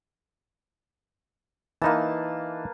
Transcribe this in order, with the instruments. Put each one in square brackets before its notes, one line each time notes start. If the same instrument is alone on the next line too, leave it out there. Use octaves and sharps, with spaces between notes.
[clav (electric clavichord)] E3 D#4 [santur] A#3 B4 A5